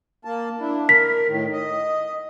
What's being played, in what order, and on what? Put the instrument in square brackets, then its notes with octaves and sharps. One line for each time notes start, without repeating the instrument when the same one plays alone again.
[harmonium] A#3 A5
D4 E4
[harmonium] A#4 [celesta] B6
[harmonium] A2 D#3
D#5